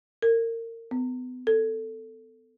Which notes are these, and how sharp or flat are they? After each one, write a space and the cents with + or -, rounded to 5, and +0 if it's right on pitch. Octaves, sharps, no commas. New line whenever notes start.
A#4 -30
B3 +35
A4 +15